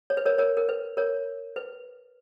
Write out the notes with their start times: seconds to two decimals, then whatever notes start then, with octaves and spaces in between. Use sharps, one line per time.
0.10 C#5
0.17 B4
0.25 A#4 C#5
0.38 A#4 C#5
0.57 A#4
0.69 B4
0.97 A#4 C#5
1.56 B4